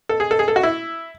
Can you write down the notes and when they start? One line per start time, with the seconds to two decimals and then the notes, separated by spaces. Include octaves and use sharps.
0.09 A4
0.20 G#4
0.31 A4
0.39 G#4
0.48 A4
0.56 F#4
0.63 E4